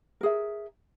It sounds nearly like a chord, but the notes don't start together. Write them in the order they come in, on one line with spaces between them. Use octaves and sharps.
A#4 G#4 E5